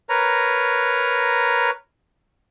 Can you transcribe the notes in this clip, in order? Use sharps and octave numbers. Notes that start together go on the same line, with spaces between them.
A#4 B4 C#5 A#5